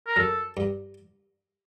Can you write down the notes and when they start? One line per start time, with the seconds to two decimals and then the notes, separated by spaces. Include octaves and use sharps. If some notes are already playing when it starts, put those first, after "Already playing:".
0.07 A#4
0.16 F#2 A4
0.57 G2